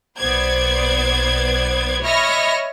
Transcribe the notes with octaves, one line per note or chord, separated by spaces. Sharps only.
B1 B3 C5 D5 G#6
C#5 D#5 E5 B5 F6 A#6